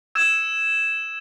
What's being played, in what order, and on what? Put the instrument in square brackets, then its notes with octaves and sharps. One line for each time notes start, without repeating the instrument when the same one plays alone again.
[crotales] E6 G#6 E7